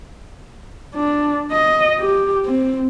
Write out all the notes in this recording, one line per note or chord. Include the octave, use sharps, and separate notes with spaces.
D4
D#5
G4
C4